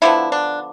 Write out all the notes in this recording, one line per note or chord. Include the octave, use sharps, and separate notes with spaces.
D3 F3 B3 E4
D4